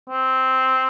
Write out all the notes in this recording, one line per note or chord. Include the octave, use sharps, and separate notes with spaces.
C4